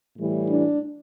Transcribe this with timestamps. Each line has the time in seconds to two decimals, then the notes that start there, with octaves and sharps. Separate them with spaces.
0.17 A2 E3 G3
0.50 D4